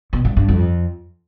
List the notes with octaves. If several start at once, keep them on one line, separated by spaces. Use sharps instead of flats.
B2
G2
G2
F2